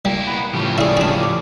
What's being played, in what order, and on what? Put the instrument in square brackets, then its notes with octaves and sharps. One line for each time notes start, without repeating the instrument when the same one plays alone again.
[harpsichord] G3 [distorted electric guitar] A#3 E4
[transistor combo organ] B3 F#5 B5
[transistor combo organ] A2 C#3 F3 [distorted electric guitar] E3 G4
[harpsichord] E4 G#4 [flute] D5
[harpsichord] D4 G#4
[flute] D6